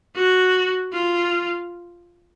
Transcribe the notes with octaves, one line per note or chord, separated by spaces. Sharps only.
F#4
F4